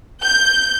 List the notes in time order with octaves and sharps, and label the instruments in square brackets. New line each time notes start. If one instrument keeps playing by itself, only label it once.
[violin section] G6